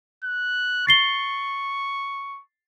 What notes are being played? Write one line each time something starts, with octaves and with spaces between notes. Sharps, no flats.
F#6
C#6 A6 C7 G7